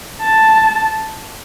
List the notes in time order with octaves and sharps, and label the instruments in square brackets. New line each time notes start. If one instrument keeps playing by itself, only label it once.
[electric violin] A5